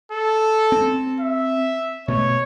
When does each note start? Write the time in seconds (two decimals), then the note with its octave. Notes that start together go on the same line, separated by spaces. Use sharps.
0.12 A4
0.72 C4
1.20 E5
2.08 B2 A3 C#5